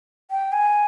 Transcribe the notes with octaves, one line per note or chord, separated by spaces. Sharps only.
G5
G#5